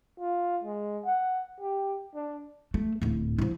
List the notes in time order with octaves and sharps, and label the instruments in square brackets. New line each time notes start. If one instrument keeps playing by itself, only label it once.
[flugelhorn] F4
G#3
F#5
G4
D4
[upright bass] A3
D1 A2
F3 E4